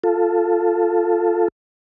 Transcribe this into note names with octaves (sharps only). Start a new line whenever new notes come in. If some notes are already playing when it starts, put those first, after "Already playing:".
F4 A4